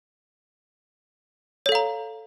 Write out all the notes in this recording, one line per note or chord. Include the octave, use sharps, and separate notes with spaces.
A4 C#5 F5 A#5